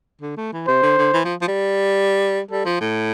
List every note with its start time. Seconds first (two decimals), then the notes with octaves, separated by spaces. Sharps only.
0.22 D3
0.37 A3
0.53 E3
0.67 C3 C5
0.83 D3
0.98 D3
1.13 E3
1.25 F3
1.41 F3
1.48 G3
2.51 G3 A4
2.66 F3
2.81 A2